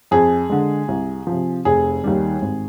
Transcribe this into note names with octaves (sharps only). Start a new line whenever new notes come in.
F2 G#4
D3 G#3
C2
F3
C3
F1 G#4
D#2 D#3 G3
G#1